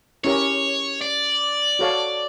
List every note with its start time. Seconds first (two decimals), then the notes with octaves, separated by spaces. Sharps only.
0.24 C#4 E4 G4 A#4 C#5
1.01 D5
1.79 F#4 A4 C#5 F5 A5